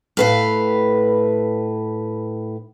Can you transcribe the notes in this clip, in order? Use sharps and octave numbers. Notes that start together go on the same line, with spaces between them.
A2 B4 F5